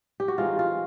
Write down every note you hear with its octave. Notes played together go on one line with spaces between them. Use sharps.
G4
F#4
E3 G#3 C4 D#4 F4
F4